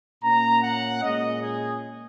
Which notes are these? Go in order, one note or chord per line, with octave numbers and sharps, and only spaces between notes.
A#2 A#3 C#4 A#5
F#5
A#2 G#3 C#4 D#5
G#4